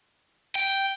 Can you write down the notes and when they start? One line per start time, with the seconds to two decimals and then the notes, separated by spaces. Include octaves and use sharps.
0.55 G5